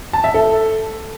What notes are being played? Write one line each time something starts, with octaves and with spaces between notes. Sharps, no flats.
A5
E5
A4